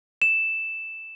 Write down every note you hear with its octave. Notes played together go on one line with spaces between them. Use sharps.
E7